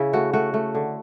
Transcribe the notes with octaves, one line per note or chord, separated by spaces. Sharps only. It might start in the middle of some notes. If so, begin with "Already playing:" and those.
Already playing: C#3 E4
A3 F#4
A3 F#4
A3
D3